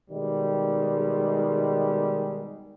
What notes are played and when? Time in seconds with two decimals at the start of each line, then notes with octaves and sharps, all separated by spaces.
0.10 B2 D#3 G3 G#3